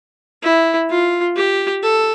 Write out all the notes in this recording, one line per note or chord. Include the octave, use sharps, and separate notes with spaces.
E4
F4
G4
A4